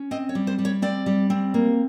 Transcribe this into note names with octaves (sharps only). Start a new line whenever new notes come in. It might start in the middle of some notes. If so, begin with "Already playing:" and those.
Already playing: C#4
C4 D#5
C#5
G3
C5
G3
C#5
C4 D5
G3
C4
A#3